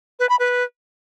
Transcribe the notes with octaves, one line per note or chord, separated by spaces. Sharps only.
B4
B5
B4